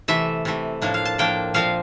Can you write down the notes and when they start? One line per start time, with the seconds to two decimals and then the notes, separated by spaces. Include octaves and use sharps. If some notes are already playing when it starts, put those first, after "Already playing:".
0.08 C3 E3 A3 E5
0.45 C3 E3 A3
0.82 A2 F3 A#3 D4
0.94 F5
1.05 A5
1.18 A2 F3 A#3 D4 G5
1.54 A#2 F3 C4 F5